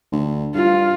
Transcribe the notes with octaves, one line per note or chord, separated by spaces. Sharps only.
D2
G2 F4